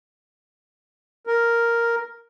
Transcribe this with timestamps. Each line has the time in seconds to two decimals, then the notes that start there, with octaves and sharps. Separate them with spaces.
1.27 A#4